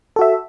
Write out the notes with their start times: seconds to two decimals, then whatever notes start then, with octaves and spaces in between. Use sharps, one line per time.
0.16 A4
0.19 F#4
0.21 E5